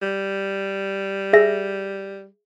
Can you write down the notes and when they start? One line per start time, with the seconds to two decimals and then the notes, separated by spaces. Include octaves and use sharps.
0.02 G3
1.33 G#4 E5 A#6